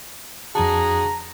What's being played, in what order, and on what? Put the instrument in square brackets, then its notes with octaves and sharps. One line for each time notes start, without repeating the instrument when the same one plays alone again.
[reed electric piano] F2 A5 [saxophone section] D4 F#4 G#4 [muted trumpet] A#5